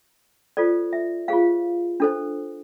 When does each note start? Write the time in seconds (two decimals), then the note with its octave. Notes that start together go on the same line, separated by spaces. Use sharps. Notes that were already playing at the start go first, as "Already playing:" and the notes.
0.57 F4 A4 C5 D5
0.93 E5
1.28 F4 G#4 C5 F5
2.00 D4 A4 C5